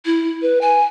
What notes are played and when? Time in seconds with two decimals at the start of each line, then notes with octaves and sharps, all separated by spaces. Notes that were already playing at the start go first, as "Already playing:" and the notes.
0.05 E4
0.42 B4
0.61 G#5